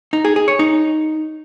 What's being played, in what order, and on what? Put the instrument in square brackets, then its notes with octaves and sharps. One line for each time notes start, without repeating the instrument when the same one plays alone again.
[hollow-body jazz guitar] D#4
G#4
G#4
C#5
D#4